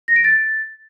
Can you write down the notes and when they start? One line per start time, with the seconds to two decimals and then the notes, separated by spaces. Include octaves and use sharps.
0.08 A#6
0.16 D7
0.24 A6